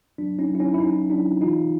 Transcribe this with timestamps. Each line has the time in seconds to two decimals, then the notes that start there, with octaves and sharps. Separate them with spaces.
0.18 F#3 D4
0.39 C#4 D#4
0.50 F#3
0.55 E4
0.59 C#4 D#4
0.74 E4
0.80 F#3 C#4 D#4
1.10 F#3 D4 E4
1.41 E3 D#4 F4